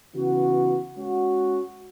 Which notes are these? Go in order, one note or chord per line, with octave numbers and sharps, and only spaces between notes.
C#3 E3 B3 F#4
G#3 C#4 F#4